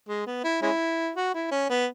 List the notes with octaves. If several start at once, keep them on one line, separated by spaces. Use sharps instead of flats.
G#3
B3
E4
G#3 C#4 E4
F#4
E4
C#4
B3